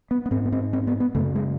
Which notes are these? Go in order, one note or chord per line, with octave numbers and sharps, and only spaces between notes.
B3
B3
G#2 C4
B3
C4
C4
B3
B3
F#2 C#3 A3
G#3